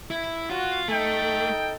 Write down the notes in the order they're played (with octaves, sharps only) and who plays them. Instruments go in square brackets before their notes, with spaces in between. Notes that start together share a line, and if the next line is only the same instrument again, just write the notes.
[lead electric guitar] E4
[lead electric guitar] F4 [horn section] F#4
[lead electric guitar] A3 [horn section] D#4 A4 G5